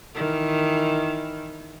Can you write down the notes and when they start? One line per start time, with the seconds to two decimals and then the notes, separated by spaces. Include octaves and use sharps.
0.15 D#3 E3